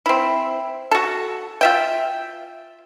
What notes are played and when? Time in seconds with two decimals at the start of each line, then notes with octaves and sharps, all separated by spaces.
0.06 C4 E4
0.91 F#4 A4
1.61 F4 E5 G5